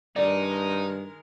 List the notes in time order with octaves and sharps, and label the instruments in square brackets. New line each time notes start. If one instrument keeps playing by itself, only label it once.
[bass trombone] G2 [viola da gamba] D#3 G#3 A#4 [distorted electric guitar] D#4 [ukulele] D5